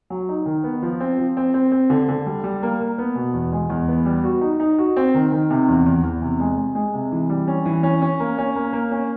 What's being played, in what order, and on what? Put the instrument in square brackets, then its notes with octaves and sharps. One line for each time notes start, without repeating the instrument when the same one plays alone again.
[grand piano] F#3
D#4
D#3
B3
F3
C4
F3
C4
C4
C4
D3
D3
G3
G3
A#3
A#3
B3
B2
E2
G#3
E2
B3
G3
F#4
D#4
D#4
F#4
C4
D#3
D#3
C3
E2
E2
E2
C3
G#3
G#3
G#3
C3
E3
G3
C#4
E3
C#4
C#4
A#3
C#4
A#3
A#3
C#4